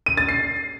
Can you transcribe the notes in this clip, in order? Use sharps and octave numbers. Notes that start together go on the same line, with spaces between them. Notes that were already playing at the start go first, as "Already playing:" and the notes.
D#7
A6
C7